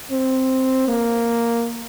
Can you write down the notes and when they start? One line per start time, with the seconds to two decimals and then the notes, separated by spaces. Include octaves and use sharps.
0.12 C4
0.88 A#3